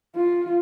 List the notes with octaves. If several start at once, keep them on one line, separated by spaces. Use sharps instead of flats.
F4